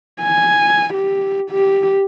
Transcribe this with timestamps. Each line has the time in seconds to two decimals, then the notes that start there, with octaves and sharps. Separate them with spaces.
0.22 G#5
0.94 G4
1.51 G4